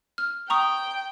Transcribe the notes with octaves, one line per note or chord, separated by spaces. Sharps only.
F6
G5 A#5 C#6 D#6